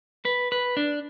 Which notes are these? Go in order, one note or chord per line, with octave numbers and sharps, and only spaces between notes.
B4
B4
D4